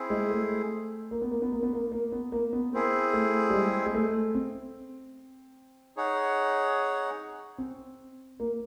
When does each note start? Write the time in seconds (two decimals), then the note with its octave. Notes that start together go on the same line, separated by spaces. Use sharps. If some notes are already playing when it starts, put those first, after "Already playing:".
Already playing: C4 E4 G#4
0.10 G#3
0.30 A3
1.11 A#3
1.21 B3
1.31 A#3
1.42 B3
1.52 A#3
1.63 B3
1.73 A#3
1.92 A#3
2.12 B3
2.32 A#3
2.53 B3
2.73 A#3 C4 E4 G#4
3.13 A3
3.50 G3
3.54 G#3
3.86 G#3
3.94 A3
4.35 C4
5.97 D#4 G#4 C#5 F#5
7.58 C4
8.40 A#3